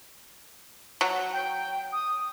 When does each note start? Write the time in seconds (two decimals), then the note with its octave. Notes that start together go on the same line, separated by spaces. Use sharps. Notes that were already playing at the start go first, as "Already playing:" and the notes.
1.01 F#3
1.33 G5
1.93 D#6